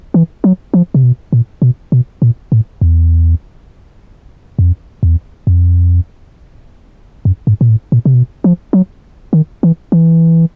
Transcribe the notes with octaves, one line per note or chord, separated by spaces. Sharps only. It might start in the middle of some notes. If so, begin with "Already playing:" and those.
E3
F#3
F3
C3
B2
A#2
B2
B2
A#2
A2
E2
F2
E2
F2
F#2
G#2
A#2
A2
A#2
C3
B2
F3
F#3
D#3
E3
E3